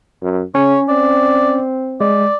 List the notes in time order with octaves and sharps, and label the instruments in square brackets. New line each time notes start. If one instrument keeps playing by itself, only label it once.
[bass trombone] F#2
[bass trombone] C#3 [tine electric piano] C#4 [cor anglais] C#5
[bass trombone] C4 [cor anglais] D5
[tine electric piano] G#3 [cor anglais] D5